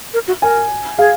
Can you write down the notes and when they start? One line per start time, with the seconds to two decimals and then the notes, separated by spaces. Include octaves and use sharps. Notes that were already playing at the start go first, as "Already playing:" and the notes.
0.14 A#4
0.28 F#4
0.42 A#4 G#5
0.98 G#4 F5